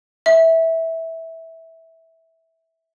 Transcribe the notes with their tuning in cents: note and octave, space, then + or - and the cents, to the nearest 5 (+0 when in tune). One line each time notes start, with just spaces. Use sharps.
E5 -15